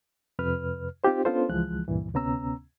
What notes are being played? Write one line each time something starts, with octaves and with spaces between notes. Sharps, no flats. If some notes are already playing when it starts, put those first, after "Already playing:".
F2 C3 B4 F6
C4 D#4 F4 G4 C5
B3 C#4 D4 F4 A4 C5
C#2 E3 F3 G#3 F#6
C#2 G2 A#2 E3
D2 C3 B3 C#4 A#5 E6